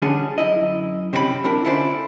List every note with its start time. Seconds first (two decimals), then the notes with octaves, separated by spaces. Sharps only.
0.02 D3 G3 C#4 D4 G#4
0.38 F#2 E4 D#5
1.13 C3 C4 C#4 G4 A#4 B5
1.44 C4 D4 E4 A#4
1.65 D3 C#4 E4 F4 C5 D5